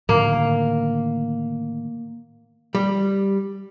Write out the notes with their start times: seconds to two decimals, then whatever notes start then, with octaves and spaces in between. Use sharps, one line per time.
0.09 A2 D3 D#3 A#3
2.75 G3